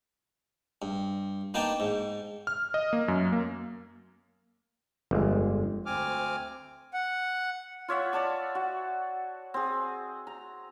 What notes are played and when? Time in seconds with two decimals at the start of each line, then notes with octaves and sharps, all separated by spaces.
0.82 G2
1.54 A#3 B3 D4 D#4 G5 A5
1.80 G#2
2.47 F6
2.74 D#5
2.93 A#3
3.08 F#2
3.32 A#3
5.11 G1 F2 G#3
5.86 D2 C4 G#5 D6 F6
6.93 F#5
7.88 F4 C#5 E5 F#5
8.13 C#5 D5 A5 D6
8.55 F#4
9.54 C4 G#4
10.27 A#5